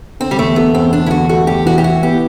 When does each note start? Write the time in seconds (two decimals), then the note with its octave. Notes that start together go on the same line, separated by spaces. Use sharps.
0.20 D3 C4
0.31 G3
0.39 E2 A3
0.56 A3 B3
0.74 E2 C4
0.93 D3 D4
1.06 E4
1.11 E2 F#4
1.29 A3 F#4
1.47 E2 G4
1.65 E3 F#4
1.78 G4
1.84 E4 F#4
2.02 B3 G4